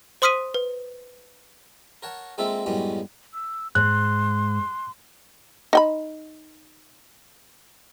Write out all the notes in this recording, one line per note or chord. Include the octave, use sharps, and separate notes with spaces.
C5 C6 D#6 F6 B6 D#7
B4
A#4 C#5 F#5 A5
G#3 A#3 C4 F4 A4 E5
F#2 A2 G3 G#3 B3 C#4
E6
G#2 C6 F#6
D#4 G5 B5